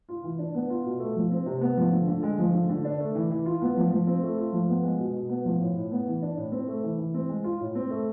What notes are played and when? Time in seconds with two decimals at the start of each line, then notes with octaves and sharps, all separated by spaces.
0.09 F4
0.24 E3
0.39 D4
0.55 B3
0.70 F4
0.85 B2
1.00 A3
1.16 F3
1.31 C4
1.46 C3
1.61 B3
1.77 F3
1.92 D3
2.07 D3
2.23 G#3
2.38 F3
2.53 D3
2.69 D3
2.85 D4
3.00 A3
3.15 E3
3.31 E3
3.46 F4
3.62 B3
3.77 F3
3.91 F3
4.07 C4
4.23 A3
4.38 F4
4.53 F3
4.69 B3
4.83 G#3
4.99 B2
5.15 B2
5.29 B3
5.45 F3
5.61 A2
5.76 A2
5.91 B3
6.07 E3
6.22 D4
6.37 A2
6.52 C4
6.68 A3
6.83 E3
6.98 E3
7.14 C4
7.29 G#3
7.44 F4
7.60 A2
7.75 C4
7.90 A3